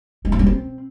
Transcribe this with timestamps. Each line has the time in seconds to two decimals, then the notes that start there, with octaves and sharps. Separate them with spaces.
0.25 G#3
0.32 F3
0.39 G3
0.47 C4